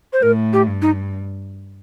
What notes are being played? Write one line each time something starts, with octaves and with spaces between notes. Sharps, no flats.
C5
A2 A#4
G4
G2
D#4